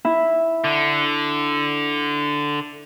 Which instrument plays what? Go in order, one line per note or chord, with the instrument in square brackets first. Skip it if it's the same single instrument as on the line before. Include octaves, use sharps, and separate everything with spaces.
[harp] E4
[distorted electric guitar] D3